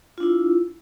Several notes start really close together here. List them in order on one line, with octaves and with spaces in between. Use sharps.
F4 D4 E4